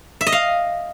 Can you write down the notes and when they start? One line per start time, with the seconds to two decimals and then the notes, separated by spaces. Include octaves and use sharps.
0.21 E5
0.27 D#5
0.32 F5